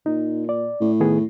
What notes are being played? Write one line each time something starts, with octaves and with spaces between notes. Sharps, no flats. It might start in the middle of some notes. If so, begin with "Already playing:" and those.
A#2 D#4
D5
A2
D#3 B3 G#4